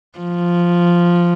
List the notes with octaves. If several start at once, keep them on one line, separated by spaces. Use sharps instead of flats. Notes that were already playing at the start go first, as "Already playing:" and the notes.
F3